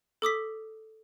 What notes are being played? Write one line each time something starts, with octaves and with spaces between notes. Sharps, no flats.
A4 D6 D#6 B6